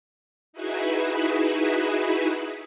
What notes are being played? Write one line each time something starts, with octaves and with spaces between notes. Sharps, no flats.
D#4 E4 F#4 G#4 B4 E5